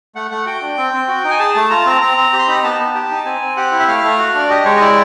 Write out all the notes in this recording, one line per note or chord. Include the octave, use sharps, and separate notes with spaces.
A3 F#5
A3 F#5
F#4 G5
D4
C4
C4
F#4
D#4
G#5
G#4 A5
A3 A5
F4 A#5
A5
C4 A#5
C4 A#5
C4
G4
C6
D#4 B5
A#5
B3 A5
B3
G4
D#4
C4 G#5
C4
G4 F#5
E4
E5
A3 F5
A3
F#4
D4 D5
G4 D#5
G#3 C#5
D#5
E4 D5